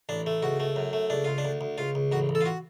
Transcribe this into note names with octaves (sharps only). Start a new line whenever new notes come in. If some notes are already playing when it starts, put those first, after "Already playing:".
A1 D4
A3
C#2 F#4
A3
F#2
A3
C#2 D4
C#2 F4
D4
D2
D2
C#2 F4
C#2
A1 F#4
A1
A4
F4
F#4